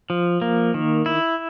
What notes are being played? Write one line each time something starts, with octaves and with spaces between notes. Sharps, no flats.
F3
A#3
D#3
E4